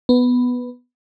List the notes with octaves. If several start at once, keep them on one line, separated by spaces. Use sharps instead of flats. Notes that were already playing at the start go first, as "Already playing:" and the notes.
B3